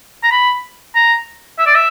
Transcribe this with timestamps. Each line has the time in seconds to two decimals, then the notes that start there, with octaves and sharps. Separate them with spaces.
0.23 A#5
0.31 B5
0.95 A#5
1.59 E5
1.67 D5
1.75 E5